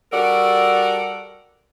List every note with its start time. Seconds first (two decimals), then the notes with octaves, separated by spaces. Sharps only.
0.13 G3 F#4 A4 A#4 D5 F#5